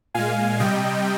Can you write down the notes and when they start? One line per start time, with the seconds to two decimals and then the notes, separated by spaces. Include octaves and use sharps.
0.14 A#2 G#3 F5 G#5
0.60 C3 G3 D#5 G5